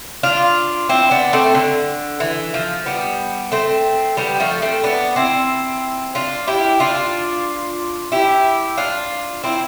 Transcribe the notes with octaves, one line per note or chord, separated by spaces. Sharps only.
D4 F4
C4 E4
B3 D4
A3 C4
D3
E3
F3
G3 B3
A3 C4
G3 B3
F3 A3
A3 C4
B3 D4
C4 E4
D4 F4
E4 G4
D4 F4
E4 G4
D4 F4
C4 E4